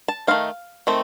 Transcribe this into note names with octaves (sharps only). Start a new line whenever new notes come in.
A5
D#3 A3 C4 D#4 F5
D#3 A3 C4